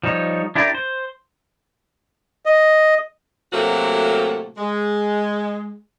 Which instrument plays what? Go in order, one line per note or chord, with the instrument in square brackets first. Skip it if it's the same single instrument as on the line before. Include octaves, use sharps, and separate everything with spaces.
[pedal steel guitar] F3 G3 D#4 C#5
D4 E4 G4 A#4 D5
C5
[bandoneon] D#5
[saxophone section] A2 C3 F#3 A3 A#3 F#4
G#3